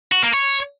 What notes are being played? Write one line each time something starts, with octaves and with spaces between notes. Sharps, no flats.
F#4
A#3
C#5